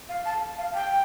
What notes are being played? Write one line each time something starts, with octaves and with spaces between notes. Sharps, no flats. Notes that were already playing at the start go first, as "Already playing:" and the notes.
F5
A5
F5
G5